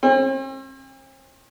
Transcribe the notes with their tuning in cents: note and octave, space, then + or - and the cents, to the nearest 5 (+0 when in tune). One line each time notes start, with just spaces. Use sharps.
C4 +45